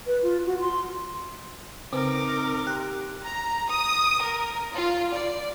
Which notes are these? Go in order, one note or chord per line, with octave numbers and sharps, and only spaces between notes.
B4
F4
F#4
C6
C#3 C4 D#4 A#4 D6
G4 C6 F#6
A#5
D#6
A#4
F4
D5